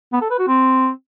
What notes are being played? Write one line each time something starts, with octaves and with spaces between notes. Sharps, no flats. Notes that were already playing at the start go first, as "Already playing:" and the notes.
B3
A4
B4
F#4
C4